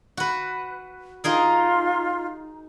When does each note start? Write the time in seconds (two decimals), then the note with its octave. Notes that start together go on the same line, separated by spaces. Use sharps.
0.17 F#4 B4
1.24 D#4 F4 G#4 A#4